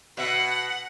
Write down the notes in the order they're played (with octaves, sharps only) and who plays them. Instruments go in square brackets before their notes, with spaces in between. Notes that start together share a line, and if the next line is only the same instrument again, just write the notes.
[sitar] B2 E5 [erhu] F#5